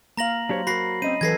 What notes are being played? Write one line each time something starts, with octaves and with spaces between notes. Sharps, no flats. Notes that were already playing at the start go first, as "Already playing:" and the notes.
A#3 F5 A#5 A#6 F#7
F#3 D4 G4 C5 C#5
F#4 A#4 B5 A#6 C7
C4 C#4 C5 D#5 D#7
E3 F#3 A4 B4 G#6 A#6 C7